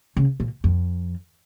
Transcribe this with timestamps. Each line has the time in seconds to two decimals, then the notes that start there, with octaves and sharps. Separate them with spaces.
0.17 C#3
0.40 A#2
0.64 F2